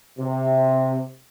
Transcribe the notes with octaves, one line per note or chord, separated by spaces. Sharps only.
C3